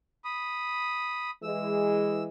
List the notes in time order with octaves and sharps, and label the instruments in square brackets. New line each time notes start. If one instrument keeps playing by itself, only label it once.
[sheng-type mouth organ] B5 D#6
[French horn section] E3 G#3 [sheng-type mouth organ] E6